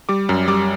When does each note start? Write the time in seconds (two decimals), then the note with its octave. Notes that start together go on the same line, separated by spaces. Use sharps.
0.09 G3 D6
0.29 F#2
0.48 G3 D6